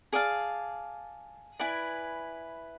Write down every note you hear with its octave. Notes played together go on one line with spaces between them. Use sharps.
G#4 D5 F5 A5
E4 B4 D5 G#5